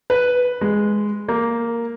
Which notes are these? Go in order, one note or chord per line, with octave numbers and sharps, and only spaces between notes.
B4
G#3
A#3